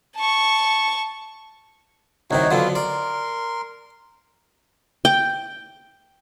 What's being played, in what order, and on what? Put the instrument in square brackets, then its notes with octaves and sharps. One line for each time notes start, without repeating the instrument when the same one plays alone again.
[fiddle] A5 C#6
[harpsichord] C2 C3 D#3 [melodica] D#4 F#4 C#5
[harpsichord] F2 D3 F#3 [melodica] B3 F4
[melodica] A#4 C6 [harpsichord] D5
[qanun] G5